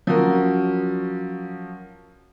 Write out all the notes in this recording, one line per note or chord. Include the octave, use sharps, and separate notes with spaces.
F3 F#3 C#4 F#4 A#4